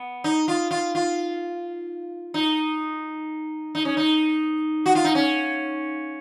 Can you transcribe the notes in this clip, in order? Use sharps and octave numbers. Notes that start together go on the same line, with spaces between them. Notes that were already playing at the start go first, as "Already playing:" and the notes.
Already playing: B3
D#4
F4
F4
F4
D#4
D#4
C#4
D#4
F#4
F4
D#4
C#4